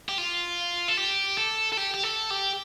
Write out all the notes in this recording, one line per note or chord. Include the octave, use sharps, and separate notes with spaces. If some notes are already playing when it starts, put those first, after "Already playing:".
G4
F4
A4
G4
A4
A4
G4
G4
A4
G4